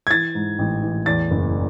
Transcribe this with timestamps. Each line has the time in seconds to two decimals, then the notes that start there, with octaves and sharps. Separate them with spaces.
0.07 G#6
0.11 E3 A6
0.35 G#2
0.59 A1
0.83 E3
1.06 E2 A6
1.31 F#1